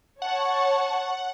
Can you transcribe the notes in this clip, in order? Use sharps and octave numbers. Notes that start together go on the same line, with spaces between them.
C#5 F#5 A5 C#6